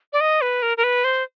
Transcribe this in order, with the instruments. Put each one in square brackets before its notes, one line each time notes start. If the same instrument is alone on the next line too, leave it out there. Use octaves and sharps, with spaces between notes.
[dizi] D5
D#5
B4
A#4
A#4
B4
C5